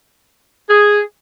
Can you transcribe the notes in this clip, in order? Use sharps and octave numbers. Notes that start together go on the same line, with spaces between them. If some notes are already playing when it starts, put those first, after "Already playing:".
G#4